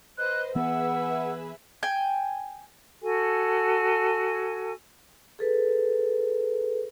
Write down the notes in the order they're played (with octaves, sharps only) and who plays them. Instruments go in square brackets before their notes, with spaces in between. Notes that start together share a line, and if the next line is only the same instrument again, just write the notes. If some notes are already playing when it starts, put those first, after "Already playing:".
[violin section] B4 C5 D#5 [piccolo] F#6
[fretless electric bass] E3 B3 [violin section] G#4 B4 E5 [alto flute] F#5 [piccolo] E6
[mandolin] G5 G#5
[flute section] F#4 A4 G#5
[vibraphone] G#4 A4 B4